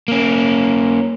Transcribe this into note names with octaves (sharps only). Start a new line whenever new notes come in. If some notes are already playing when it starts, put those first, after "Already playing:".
A#3 C#4